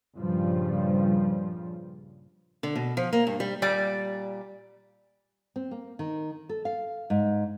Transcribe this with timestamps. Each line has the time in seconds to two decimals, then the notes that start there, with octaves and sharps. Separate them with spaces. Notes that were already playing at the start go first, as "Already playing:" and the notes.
0.18 G2 A#2 C#3 F3 G3
2.63 D3
2.76 B2
2.97 F3
3.13 A#3
3.27 G2
3.40 G3
3.62 A#2 G3 D5
5.56 C4
5.71 A#3
5.99 D#3
6.49 A4
6.65 F5
7.10 G#2